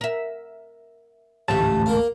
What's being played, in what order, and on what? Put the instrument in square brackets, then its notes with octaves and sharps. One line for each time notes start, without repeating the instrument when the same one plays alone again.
[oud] A#4 E5
[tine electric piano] A1 D2 A5 [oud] G#2 A3 [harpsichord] C3 F3
[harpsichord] A#3 A#4 F5